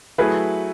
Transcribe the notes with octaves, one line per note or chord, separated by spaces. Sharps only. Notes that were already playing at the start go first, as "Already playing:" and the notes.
F#3 A3 E4 G#4 B4